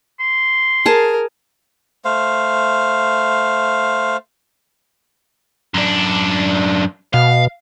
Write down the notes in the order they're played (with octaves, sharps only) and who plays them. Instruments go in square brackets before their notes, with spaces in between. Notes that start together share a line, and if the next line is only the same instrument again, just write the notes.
[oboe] C6
[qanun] G#4 A5 [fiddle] A#4
[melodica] A3 C5 F5
[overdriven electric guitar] F#2 D4
[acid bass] B2 [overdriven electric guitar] F5